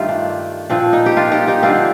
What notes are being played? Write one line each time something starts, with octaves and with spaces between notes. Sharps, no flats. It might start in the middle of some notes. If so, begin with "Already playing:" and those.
Already playing: G2 D#3 A3 F4 G4
D4
A#2 F3 C4 D4
D#4
G4
D4 F4
D#4 G4
D#4 G4
D3 G3 C4 D4 F4